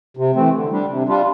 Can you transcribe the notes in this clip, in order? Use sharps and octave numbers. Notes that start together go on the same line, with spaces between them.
C3
E3 A3 C4
D3
G3 D4
C3
G3 D4 F4